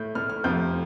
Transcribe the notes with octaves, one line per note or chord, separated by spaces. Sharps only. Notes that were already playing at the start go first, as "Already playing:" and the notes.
Already playing: A2 A3 G6
A2 A3 F6
F6
F2 C3 F3 G6